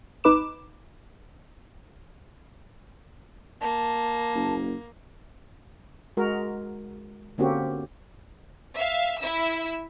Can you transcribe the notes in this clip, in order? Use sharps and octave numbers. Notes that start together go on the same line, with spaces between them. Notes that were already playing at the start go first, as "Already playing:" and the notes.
G#1 D#4 B4 D6 E7
A#3 A5
F#1
G#3 F#4 A#4
D3 A#3 C4 C#4 F#4 G4
E5 F5
E4 E5 E6